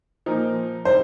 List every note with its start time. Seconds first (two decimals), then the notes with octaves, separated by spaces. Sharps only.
0.26 A#2 F3 D#4 A#4
0.85 C3 G3 D#4 C5